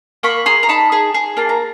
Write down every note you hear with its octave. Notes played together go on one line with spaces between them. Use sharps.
A#3 B5 C#6
G#4 A#5 C6
A#5
D#4 A5 B5
G#4
G#4
A#3 A5
A#5